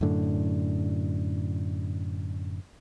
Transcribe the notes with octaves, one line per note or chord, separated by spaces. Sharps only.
F#2 A2 D3